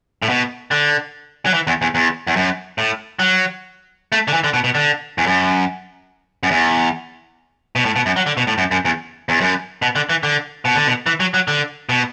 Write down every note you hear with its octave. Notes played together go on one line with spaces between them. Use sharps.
A2
B2
D3
F#3
E3
E2
E2
E2
E2
F#2
A2
F#3
A3
D3
E3
D3
B2
B2
D3
E2
F#2
F#2
E2
B2
A2
B2
F#2
F#3
D3
B2
A2
F#2
F#2
E2
E2
F#2
B2
D3
E3
D3
B2
D3
B2
E3
F#3
F#3
D3
B2